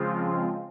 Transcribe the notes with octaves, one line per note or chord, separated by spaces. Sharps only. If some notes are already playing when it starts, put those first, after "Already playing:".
Already playing: C#3 F3 G#3 C4 F4